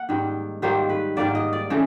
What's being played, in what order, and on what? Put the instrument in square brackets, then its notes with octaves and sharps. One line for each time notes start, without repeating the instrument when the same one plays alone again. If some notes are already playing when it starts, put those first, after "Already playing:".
Already playing: [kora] A#3 F#5
G#2 D#3 G3
G#2 D#3 G3 A#3 C5
B4
G#2 D#3 G3 A#3 D5
D#5
D5
C#3 E3 A3